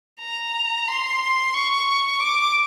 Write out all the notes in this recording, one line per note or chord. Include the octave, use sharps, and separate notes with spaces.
A#5
C6
C#6
D6